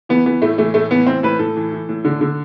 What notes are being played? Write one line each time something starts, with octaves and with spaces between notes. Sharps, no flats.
E3 B3
E3 B3
A2 A3
E3 A3
A2 A3
E3 B3
E3 C4
A2 B4
A2 A4
E3
E3
A2
D3
D3